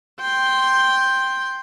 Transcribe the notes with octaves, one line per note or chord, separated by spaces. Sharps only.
G5 C6